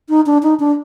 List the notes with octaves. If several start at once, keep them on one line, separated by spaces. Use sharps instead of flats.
D#4
D4
D#4
D4